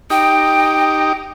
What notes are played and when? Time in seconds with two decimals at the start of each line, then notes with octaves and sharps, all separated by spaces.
0.10 D#4 G4 G5